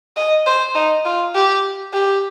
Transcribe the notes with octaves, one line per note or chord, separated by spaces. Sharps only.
D#5
C5
D#4
F4
G4
G4